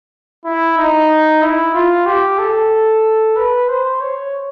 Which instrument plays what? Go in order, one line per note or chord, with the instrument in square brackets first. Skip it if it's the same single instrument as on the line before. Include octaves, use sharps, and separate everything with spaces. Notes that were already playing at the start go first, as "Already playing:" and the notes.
[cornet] E4
D#4
E4
F4
G4
A4
B4
C5
C#5